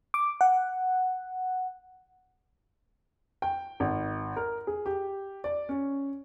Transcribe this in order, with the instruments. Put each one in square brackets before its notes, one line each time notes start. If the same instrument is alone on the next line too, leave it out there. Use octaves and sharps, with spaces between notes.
[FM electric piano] D6
F#5
[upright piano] G5
G#1
A#4
G#4
G4
D5
C#4